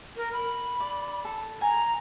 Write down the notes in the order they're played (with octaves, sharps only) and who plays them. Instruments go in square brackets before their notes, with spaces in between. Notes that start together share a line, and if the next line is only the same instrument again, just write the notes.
[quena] A#4
B5
[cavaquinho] D5
A4
[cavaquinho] G#5 [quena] A#5